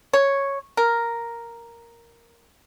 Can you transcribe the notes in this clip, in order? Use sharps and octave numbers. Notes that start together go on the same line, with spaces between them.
C#5
A#4